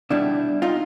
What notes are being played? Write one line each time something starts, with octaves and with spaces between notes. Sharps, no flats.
B2 G3 D4 E4
D#4 F4